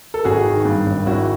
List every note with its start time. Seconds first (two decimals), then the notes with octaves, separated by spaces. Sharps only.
0.14 A4
0.25 G#1 F#4 G#4
0.45 D#3
0.65 G2
0.86 G#1
1.06 G#1 E4 F#4